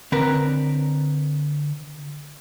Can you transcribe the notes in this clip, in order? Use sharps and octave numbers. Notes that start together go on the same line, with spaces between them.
D3 C4 A#4 B4